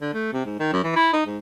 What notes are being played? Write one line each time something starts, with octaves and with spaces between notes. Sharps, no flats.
D3
A3
C3
G#2
D#3
F#2
E3
E4
D#4
G#2